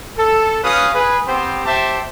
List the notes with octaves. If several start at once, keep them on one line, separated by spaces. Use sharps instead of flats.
A4
C#4 F#4 B4 F5 D#6
G#4 B4
B3 C4 G4 C5
G4 C5 E5 G5 A5